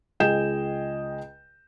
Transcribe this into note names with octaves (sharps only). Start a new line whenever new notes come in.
C#2 G#4 D#5 G5 G6 E7